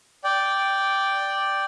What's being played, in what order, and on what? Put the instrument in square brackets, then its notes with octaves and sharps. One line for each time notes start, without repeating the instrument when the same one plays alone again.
[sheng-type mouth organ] D5 G5